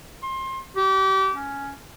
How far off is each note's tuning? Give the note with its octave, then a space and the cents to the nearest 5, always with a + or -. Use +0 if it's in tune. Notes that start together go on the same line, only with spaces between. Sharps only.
C6 +25
G4 -30
C#4 +5